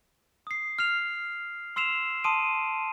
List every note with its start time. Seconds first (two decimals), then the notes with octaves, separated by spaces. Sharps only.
0.47 D#6 C7
0.79 F6 C7 F7
1.76 C6 E6 C7 E7 F7
2.24 A5 C6 D#6 D7 D#7